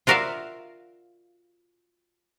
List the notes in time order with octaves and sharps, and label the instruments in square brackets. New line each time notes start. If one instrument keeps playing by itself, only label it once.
[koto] F4 F#4 A#4 D5 E5 F5